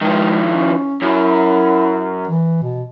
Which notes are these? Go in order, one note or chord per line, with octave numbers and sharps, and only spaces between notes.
D#3 F3 G#3
C#4
F#2 E4
E3
B2